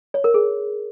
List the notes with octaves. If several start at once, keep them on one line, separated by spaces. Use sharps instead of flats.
C#5
A#4
G#4